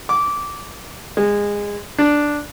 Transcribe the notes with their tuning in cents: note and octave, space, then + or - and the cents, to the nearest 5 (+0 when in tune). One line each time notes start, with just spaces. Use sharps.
D6 -15
G#3 -20
D4 +0